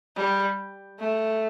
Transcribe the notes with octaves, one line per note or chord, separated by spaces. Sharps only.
G3
A3